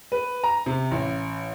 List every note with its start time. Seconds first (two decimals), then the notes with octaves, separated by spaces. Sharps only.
0.12 B4
0.44 A#5
0.66 C3
0.91 A1